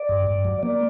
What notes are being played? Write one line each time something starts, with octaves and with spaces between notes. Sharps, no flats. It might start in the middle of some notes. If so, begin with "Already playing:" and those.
Already playing: D5
G2
G2
F#3
A#3 D5